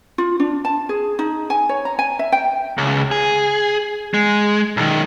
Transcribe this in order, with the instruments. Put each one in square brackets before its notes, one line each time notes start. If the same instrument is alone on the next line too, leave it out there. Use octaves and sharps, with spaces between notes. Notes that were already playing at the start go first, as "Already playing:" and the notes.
[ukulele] F4
D4
A5
G#4
D#4
G#5
C#5
A#5
G#5
E5
G5
[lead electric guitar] C#2
G#4
G#3
B1 D#3